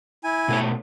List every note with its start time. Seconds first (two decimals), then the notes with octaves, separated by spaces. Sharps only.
0.24 E4 G#5
0.48 B2 A3 C#5